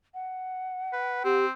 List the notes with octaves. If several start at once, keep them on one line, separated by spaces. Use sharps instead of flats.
F#5
B4
C4 G4